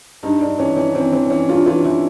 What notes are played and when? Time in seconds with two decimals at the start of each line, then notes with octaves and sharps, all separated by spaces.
0.23 G2 D#4
0.41 G2 D4
0.58 E3 C#4
0.76 E3 C#4
0.95 E3 C4
1.12 E3 C4
1.30 E3 C#4
1.49 G2 F4
1.66 E3 F4
1.84 E3 E4